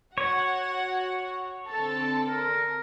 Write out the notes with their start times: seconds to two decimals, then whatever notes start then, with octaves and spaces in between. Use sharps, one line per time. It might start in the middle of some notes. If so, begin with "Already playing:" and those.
0.18 F#4 C#5 F#5
1.68 D3 C4 A4 A5
2.29 A#4